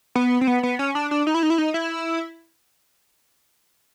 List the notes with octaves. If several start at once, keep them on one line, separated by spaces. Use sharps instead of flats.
B3
C4
B3
B3
C#4
D4
D4
D#4
E4
D#4
E4
D#4
E4